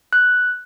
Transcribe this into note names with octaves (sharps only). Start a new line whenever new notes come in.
F#6